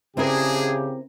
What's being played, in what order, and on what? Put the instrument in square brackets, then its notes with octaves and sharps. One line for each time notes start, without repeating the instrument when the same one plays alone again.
[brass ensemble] C#3 G4 [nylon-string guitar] C4 E4 A#4 [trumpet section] D4 G#4